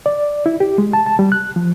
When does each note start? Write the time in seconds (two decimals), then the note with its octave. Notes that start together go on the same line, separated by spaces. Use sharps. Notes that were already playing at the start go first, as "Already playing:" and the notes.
0.06 D5
0.46 E4
0.60 G4
0.78 G#3
0.93 A5
1.06 A5
1.19 G3
1.32 F#6
1.56 F3